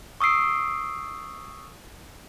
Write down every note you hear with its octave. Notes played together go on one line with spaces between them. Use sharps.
C#6 D#6 E6 C7 D7